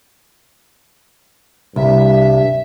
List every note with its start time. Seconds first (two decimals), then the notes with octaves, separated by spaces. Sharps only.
1.76 C2 G2 E5